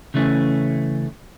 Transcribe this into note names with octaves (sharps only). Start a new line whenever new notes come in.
C#3 E3 A3 C#4